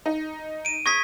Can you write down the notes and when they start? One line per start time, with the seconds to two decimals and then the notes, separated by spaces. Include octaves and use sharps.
0.06 D#4
0.65 D7 D#7
0.86 C#6 D#6 G#6 A#6 B6